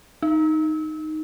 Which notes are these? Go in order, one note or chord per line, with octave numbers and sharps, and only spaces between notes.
D#4